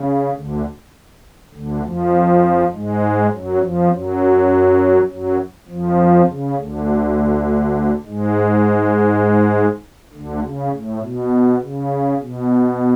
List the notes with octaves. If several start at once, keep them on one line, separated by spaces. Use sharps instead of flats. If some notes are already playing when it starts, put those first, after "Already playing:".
Already playing: C#3
D2 D3
D2 D3
F2 F3
G#2 G#3
F#2 F#3
F2 F3
F#2 F#3
F#2 F#3
F2 F3
C#3
D2 D3
G#2 G#3
D2 D3
C#3
A2
B2
C#3
B2